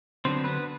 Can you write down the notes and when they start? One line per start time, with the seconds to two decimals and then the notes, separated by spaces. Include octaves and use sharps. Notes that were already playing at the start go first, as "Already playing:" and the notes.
0.25 D3 F#3 B3 C4 D4 C5
0.44 B3 B4